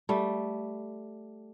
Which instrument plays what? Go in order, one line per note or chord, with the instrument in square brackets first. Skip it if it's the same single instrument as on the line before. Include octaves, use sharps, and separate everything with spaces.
[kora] G3 A3